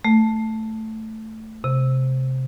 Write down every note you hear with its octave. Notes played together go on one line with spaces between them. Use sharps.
A3
C3